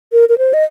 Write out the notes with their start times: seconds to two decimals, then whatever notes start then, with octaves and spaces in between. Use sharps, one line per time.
0.12 A#4
0.29 A#4
0.38 C5
0.54 D#5